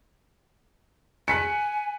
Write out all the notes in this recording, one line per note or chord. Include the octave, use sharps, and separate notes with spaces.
G#5 F#6 B6 C#7